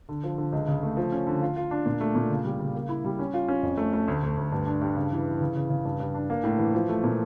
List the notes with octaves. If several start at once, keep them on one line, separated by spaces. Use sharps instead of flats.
D3
F3
D3
C#2
C#3
A3
F3
C#4
D3
F4
F4
D4
A#2
A3
A#2
C#3
G3
C#3
A#3
E4
G3
C#4
F4
C#4
F2
A3
A3
D2
D2
D2
G2
D4
G2
C#3
E3
E3
C#3
C#3
C#3
G2
G2
D4
A#3
A2
E3
F3
A3
A#2